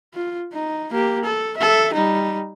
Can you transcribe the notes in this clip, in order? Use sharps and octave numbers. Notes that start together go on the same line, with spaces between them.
F4
D#4
A#3 G4
A4
A4 E5
G3 D#4